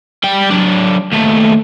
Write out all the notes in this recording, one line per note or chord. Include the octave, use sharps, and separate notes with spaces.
G3 G5
F#3 D4
D#2 A3